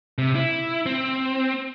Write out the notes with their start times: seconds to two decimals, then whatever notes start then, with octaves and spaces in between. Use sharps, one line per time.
0.18 C3
0.35 E4
0.86 C4